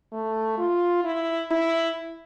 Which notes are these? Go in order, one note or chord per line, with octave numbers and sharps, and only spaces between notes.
A3
F4
E4
E4